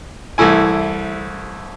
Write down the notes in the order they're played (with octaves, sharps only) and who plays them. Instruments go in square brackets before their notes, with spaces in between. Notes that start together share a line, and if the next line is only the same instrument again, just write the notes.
[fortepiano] C2 E3 A3 E4 G#5